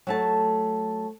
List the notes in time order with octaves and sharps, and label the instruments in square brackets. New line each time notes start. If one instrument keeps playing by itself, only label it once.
[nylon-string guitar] F#3 A3 A5